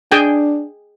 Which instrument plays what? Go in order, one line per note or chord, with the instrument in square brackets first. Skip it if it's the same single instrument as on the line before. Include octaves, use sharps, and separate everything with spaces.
[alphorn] D4 [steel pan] G#4 G5 G#5